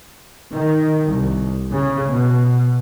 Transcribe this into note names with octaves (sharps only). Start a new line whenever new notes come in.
D#3
C2
C#3
B2